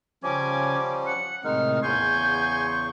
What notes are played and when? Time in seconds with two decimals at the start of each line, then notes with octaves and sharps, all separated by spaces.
0.23 C#3 F3 G3 C#4 G#5 D6
1.07 F#5 C#7
1.44 A2 C3 D#3 G#3 D#4 F6
1.83 E2 C#3 G#5 C6 C#6 G6